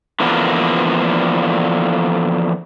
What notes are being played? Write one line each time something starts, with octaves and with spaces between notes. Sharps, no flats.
D3 E3 F3 A#3 B3